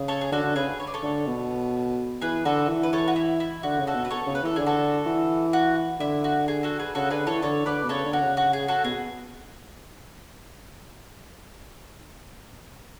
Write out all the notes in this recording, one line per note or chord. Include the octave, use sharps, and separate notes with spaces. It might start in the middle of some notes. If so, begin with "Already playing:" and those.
Already playing: C#3
A4 C#5
G#4
D3 F#4 A4
D3
C#3 G#4 B4
C#5
D5
A4 C#5
D3
B2
E3 G#4 B4
D3 F#4 A4
E3
B4
A4 C#5
F#4
E4
E4
D3 F#4
C#3
F#4 A4
B2
B4
A4 C#5
C#3
B4
E3 A4
D3 G#4
F#4 A4
E3
F#4
D3 E4
F#4
G#4
F#4 A4
G#4 B4
C#3 F#4 A4
D3 G#4 B4
E3 A4 C#5
D3 A4 C#5
D3 B4 D5
B2
C#3 A4 C#5
D3
F#4
C#3
F#4
G#4
F#4 A4
B2 G#4